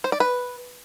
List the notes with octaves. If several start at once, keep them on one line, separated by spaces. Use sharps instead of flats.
C5
D5
B4